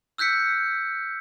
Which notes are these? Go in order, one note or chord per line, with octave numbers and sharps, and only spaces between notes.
E6 F#6 G6 B6 C#7